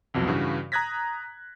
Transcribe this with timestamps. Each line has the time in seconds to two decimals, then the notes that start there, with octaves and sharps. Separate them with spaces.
0.14 C2 F2 B2 F#3
0.27 G2 C#3 E3 F#4
0.72 A#5 D#6 F#6 G#6 A#6 B6